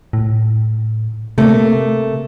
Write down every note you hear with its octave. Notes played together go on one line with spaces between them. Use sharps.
A2
C3 A3 A#3